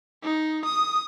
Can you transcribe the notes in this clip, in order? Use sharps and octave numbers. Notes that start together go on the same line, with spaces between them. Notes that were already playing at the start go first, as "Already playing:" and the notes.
D#4
D#6